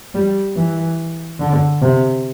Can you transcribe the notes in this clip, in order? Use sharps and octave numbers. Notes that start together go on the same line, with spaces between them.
G3
E3
D3
C3